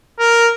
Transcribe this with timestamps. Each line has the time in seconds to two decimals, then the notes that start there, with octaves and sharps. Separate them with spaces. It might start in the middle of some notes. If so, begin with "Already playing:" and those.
0.19 A#4